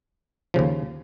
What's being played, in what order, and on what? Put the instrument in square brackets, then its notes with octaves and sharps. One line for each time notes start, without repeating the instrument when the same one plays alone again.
[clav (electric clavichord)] D#2 C#3 F3